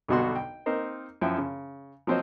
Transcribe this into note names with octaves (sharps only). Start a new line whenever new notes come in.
B1 G2 B2 D3 F#4 C6
G5
A#3 C4 D#4 A#4 C5 D#5
F#2 F3 E4 G5
C#3
F3 F#3 C4 C5 C#5 D#5